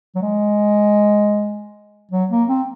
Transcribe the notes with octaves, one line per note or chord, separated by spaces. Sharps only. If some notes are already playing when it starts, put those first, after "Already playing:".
F#3
G#3
F#3
A#3
C4